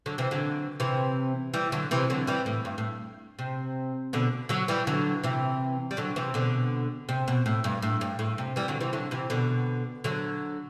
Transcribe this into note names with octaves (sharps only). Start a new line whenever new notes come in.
D3 F#3
C3 E3
D3 F#3
C3 E3
E3 G3
D3 F#3
C3 E3
D3 F#3
E3 G3
A2
G2
A2
C3
B2 D3
D3 F#3
E3 G3
D3 F#3
C3 E3
G3
D3 F#3
C3 E3
B2 D3
C3
B2
A2
G2
A2
G2
A2
C3
E3 G3
D3 F#3
C3 E3
D3 F#3
C3 E3
B2 D3
D3 F#3